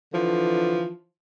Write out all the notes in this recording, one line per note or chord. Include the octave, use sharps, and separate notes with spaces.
D3 E3 F3